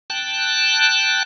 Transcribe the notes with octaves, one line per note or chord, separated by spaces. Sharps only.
G5 A5 F#6